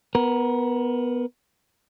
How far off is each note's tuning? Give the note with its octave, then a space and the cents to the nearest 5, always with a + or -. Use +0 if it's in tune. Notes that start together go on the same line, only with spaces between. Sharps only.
B3 +0 A#4 +20